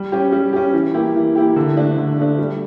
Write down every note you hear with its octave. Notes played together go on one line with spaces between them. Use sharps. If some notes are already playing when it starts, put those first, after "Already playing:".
Already playing: G3
C#4 G4
G3
C#4 G4
E3
A#3 E4 G4
E3
A#3 E4 G4
D3
A3 D4
D3
A3 D4
G3